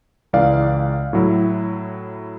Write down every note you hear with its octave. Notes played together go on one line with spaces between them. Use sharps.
C#2 E3 D5 F5
A2 F#3 E4